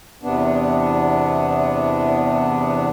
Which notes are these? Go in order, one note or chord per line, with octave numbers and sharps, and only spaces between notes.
E2 C3 B3 D4